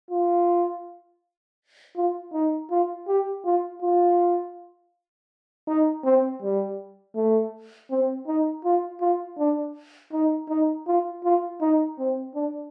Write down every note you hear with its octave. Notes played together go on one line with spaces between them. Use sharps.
F4
F4
D#4
F4
G4
F4
F4
D#4
C4
G3
A3
C4
D#4
F4
F4
D4
D#4
D#4
F4
F4
D#4
C4
D4